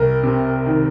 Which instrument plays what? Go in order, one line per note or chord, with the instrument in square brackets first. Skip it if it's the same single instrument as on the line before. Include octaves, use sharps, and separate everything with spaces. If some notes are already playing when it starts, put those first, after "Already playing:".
Already playing: [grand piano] C2 [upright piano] A#4
[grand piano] C3
D#3